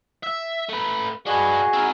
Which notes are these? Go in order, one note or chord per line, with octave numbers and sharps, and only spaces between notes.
E5
A3 B4
D4 F#4 G#4 B4 D#5
C4 A#4